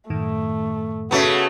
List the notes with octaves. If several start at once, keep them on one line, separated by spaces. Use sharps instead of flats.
F#2 A2 D#3 A3
C#3 A3 B3 F#4